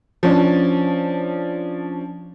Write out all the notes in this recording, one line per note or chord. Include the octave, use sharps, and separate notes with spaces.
F3 C#4 D4